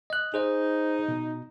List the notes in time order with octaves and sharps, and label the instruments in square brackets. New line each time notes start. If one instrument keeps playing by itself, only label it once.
[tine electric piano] D#5 F#6
[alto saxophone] D#4 [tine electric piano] G#4 C5 D#5
[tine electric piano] B2